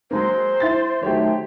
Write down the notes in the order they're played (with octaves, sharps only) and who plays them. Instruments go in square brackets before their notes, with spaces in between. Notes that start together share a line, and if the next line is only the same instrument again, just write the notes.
[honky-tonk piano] F#3 G#3 A#3 [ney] C5
[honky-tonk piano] E4 A6
[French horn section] D#3 F#3 A3 [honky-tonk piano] G4 C#5